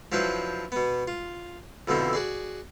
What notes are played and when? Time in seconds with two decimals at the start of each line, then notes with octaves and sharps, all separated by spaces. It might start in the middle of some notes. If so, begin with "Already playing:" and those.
0.12 F3 F#3 D4 E4 B4 C5
0.72 B2 B3
1.08 F4
1.88 F2 B2 D3 C4 E4
2.13 F#4 G#4 D5